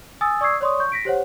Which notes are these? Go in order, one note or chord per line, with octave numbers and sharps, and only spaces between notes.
G#5 D#6 E6 A6
D5 C#6 D#6 E6 G#6 C7
C#5 D5 C6 C#6 D#6
C#6 G6
A#6 B6 D7
G4 C5 C#5 F#5